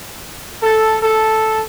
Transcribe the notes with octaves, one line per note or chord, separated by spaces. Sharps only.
A4
A4